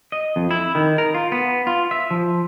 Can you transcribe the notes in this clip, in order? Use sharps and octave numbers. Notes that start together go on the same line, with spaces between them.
D#5
F2
E4
D#3
A#4
F4
B3
F4
E5
F3